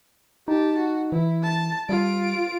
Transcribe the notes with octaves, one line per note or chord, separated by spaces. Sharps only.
D#4 G4 A5
F#4
E3 E4
A5
G3 F4 D7